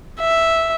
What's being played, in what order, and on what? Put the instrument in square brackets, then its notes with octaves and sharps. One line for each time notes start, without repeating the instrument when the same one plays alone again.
[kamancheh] E5